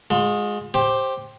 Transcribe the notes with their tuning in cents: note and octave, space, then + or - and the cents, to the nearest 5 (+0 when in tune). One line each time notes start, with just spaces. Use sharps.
G#3 +0 F4 +45
G4 +0 C5 +15